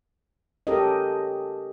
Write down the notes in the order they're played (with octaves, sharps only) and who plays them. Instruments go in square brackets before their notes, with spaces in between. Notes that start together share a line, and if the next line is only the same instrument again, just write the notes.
[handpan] C#4 G4 A4 A#4 D#5